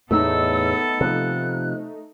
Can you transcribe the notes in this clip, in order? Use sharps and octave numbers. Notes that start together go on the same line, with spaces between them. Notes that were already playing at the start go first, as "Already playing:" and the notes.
E2 A2 A3 B3 D#4 A4 E6
C3 F3 F#6